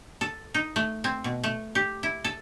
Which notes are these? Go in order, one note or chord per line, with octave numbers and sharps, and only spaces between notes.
A4
D#4
A3
C4
B2
A3
G4
E4
A4